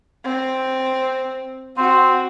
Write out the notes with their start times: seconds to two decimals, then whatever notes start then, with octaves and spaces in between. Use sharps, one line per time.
0.25 C4
1.77 C4 F#4